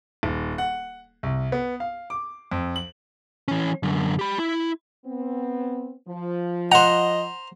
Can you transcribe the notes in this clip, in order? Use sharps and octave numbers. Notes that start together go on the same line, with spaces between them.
D#1
F#5
C2
B3
F5
D6
F2
F#7
E3 C#4
F#2 D3
G4 B5
E4
B3 C4
F3
C5 D#5 F#5 A#5